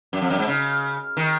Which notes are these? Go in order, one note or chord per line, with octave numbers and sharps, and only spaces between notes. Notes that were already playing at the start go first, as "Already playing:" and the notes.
F#2
F2
F#2
G#2
C#3
D#3